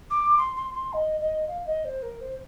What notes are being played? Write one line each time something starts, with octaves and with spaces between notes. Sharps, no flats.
D6
C6
C6
C6
D#5
D#5
F5
D#5
C5
A#4
C5